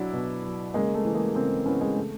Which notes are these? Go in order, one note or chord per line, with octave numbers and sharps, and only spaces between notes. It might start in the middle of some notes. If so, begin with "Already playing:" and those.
Already playing: B2 F#3 D4 E4
B2
F#3
C#3 G#3 A#3
A3
E3
G#3 A#3
C#3 A#3 C4
E3 B3 C#4
G#3 A#3
C#3 A3